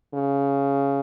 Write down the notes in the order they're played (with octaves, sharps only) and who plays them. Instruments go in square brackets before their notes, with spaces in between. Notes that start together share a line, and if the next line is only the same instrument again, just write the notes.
[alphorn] C#3